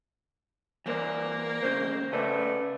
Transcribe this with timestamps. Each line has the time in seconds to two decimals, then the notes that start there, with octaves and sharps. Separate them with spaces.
0.86 E3 A#3 C5 D5
1.63 D#2 C#3 C5
2.13 C#3 A3 B4 D5